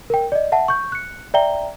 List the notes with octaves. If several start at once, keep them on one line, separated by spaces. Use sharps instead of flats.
A#4 G5
D5 D#5
E5 F#5 A5
C#6 G6
F#6 C#7
D5 E5 G5 A#5 G7